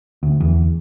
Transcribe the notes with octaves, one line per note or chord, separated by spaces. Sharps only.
D2
E2